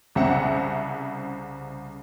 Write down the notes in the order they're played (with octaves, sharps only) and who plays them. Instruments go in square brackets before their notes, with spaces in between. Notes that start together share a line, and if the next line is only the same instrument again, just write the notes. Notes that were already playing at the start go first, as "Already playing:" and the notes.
[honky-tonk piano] C2 C#3 C4 E5 F#5